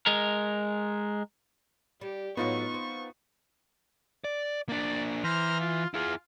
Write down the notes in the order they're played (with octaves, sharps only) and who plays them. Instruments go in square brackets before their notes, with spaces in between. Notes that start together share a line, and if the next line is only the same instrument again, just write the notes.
[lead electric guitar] G#3 A#4
[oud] G3 [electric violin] G4
[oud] A2 F#3 F#4 [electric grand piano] B3 D#4 F4 [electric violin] C#6
[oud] C4
[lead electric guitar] D5
[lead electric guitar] A#3 D4 [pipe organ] D5
[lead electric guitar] E3 [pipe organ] C5 A#5 F6
[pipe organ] F4
[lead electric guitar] E4 G#4 [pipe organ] F4